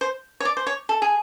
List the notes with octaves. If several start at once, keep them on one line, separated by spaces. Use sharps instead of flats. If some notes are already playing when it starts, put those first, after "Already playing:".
C5
C#5
D5
C5
C#5
A4
G#4